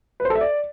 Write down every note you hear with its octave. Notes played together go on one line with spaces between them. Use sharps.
B4
C5
A4
E5
D5